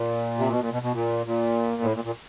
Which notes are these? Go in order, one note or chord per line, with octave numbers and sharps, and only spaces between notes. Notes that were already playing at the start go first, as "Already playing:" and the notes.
Already playing: A#2
C3
B2
A#2
B2
B2
A#2
A#2
A2
A#2
A#2